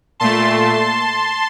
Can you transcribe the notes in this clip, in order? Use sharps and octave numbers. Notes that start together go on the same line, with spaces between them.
A#2 A3 A5 C6